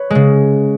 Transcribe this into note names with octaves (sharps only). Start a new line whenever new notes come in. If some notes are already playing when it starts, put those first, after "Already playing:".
Already playing: B4 C#5
C#3 G#3